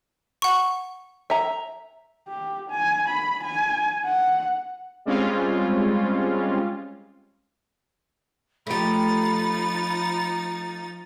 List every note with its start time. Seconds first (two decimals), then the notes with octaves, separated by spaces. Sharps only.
0.42 F#5 C#6
1.30 E5 A#5
2.28 G4
2.71 G#5
3.09 B5
3.44 G#5
4.06 F#5
5.05 G3 G#3 C4 C#4 F4
8.67 F3 A3 D#4 G4 B5 A6